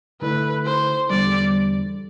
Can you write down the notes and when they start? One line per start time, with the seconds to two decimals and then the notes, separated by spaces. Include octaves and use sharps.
0.21 D3 A3 E4 A4 B4 D5
0.66 C5
1.10 E2 D3 G3 D5